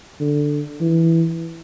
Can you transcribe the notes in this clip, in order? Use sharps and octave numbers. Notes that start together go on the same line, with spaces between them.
D3
E3